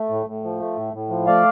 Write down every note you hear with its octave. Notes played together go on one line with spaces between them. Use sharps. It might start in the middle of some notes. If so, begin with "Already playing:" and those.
Already playing: A3
A2
A2
F3
A3
A2
A2
F3
A3 D5 F5